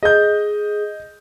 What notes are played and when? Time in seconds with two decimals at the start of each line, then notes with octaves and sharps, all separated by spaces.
0.03 G#4 D#5 G6